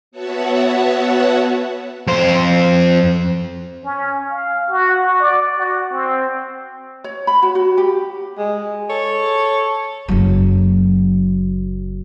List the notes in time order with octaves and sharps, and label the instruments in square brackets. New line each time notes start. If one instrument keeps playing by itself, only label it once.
[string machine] B3 F#4 C#5 E5 F#5 A5
[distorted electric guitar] F2 C5
[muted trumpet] C#4
F5
F#4
D5
F#4
C4
[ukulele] C#5
B5
F#4
F#4
G4
[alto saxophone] G#3
[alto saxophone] A4 [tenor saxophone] C#5
[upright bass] F#1 F#3